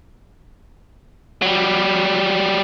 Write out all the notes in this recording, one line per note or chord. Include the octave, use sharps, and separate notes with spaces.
F#3 G3